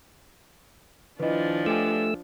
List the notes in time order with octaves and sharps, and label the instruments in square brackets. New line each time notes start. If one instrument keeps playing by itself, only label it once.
[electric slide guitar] D#3 E4 [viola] F3 D4 [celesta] B4 D#5
[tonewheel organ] A3 E6 [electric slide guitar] G4 G5 G#5